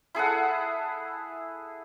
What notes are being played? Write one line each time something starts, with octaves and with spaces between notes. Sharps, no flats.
E4 G#4 A4 F#5